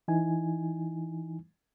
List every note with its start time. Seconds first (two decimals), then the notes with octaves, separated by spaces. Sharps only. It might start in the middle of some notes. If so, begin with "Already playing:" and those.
0.08 E3 D#4 E4 G#5